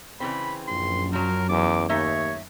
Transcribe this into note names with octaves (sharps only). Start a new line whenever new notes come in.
C#3 E3 C4 B5
A#1 F#2 C6
F3 F#3 A#4
E2 D6
D#2 A3 D#4 C#5 E5